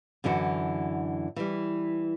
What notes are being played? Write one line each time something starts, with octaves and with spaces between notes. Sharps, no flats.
F#2 D3 E3 F#4
E3 G3